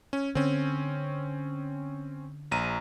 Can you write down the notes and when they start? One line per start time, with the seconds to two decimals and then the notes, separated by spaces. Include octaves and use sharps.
0.13 C#4
0.35 D3 C4 C#4
2.51 A#1 A#5 D#7